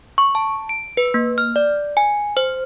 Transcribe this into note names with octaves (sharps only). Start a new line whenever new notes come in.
C#6
A5
D7
B4
A#3
F6
D5
G#5
C5